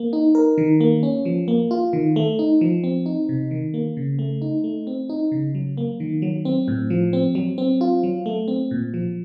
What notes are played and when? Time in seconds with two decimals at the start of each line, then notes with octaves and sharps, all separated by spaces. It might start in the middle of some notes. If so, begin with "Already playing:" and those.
Already playing: A#3
0.13 D#4
0.35 A#4
0.58 D#3
0.81 A#3
1.03 C#4
1.25 F3
1.48 A#3
1.71 F4
1.93 D#3
2.16 A3
2.39 D#4
2.61 F3
2.84 C4
3.06 D#4
3.29 C3
3.51 D#3
3.74 A#3
3.97 C#3
4.19 A3
4.42 D#4
4.64 A3
4.87 C4
5.09 D#4
5.32 C#3
5.55 F#3
5.77 A#3
6.00 D#3
6.22 F#3
6.45 C4
6.68 A2
6.90 F3
7.13 C4
7.35 F#3
7.58 C4
7.81 F4
8.03 F#3
8.26 A3
8.48 C4
8.71 A#2
8.94 F3